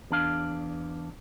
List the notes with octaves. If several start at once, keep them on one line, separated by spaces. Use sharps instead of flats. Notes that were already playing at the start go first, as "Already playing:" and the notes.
E2 D4 F5